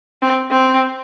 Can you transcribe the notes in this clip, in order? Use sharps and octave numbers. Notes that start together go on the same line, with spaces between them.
C4
C4